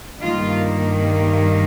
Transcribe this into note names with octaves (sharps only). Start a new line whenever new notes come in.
G2 D#3 A#3 F4